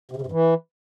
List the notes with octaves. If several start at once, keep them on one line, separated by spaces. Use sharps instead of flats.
C3
C#3
C3
G2
E3